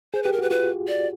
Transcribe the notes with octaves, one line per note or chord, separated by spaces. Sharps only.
G#4 C5
G4 B4
A#4
F#4 B4
F4 B4
D5